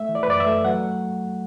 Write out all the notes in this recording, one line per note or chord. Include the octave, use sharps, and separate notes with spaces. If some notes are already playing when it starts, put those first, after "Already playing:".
Already playing: A3 E5
E3
D5
B4
F#2 D5
E5
A3
F#3 F#5